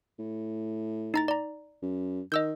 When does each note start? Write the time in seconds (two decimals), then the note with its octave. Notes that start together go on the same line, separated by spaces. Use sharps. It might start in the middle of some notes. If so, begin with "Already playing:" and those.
0.19 A2
1.14 D#4 A#5 A6
1.28 D5 A#5
1.82 F#2
2.32 D#3 D#5 E6 G6